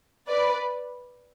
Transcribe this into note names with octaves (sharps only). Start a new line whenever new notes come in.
B4 D5